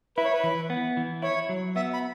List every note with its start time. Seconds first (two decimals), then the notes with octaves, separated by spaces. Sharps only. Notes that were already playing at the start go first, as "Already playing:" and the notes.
0.17 E4 B4
0.25 C#5
0.33 B4
0.44 E3
0.70 B3
0.97 E3
1.22 E4 C#5
1.49 F#3
1.76 B3 E5
1.93 B5